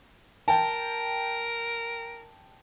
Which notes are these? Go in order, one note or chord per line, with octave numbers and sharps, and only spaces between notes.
A#4 G5 A5